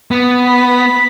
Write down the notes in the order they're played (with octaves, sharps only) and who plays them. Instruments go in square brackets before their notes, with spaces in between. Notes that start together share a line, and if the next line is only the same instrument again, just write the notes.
[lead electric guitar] B3
[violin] B5